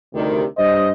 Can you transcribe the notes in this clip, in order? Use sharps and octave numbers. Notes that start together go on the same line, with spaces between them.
D2 C3 D#3 G3
G2 C5 D#5